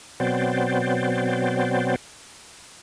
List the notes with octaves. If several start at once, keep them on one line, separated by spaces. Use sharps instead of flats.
B2 F#3 B3 C4 C5 D5